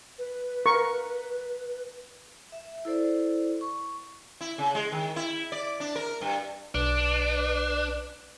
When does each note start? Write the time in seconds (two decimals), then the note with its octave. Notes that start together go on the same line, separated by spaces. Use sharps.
0.19 B4
0.66 A#4 C#6
2.52 E5
2.85 E4 A4 C5 D5
3.61 C#6
4.41 E4
4.58 C#3
4.75 G#3
4.92 D#3
5.16 E4
5.52 D5
5.80 D4
5.96 A#4
6.21 G2
6.75 B1 D4 B4